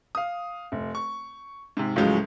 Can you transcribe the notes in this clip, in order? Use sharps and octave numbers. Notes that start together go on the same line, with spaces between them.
F5 D#6
F1
C#6
G#2 C3
C#2 A2 F3 F#3 G#3